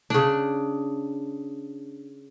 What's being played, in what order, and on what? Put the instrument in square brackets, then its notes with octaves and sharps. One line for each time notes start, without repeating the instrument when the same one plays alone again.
[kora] C#3 D4